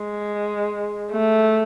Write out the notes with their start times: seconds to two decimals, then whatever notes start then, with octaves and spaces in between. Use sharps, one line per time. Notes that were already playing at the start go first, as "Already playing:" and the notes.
Already playing: G#3
1.11 A3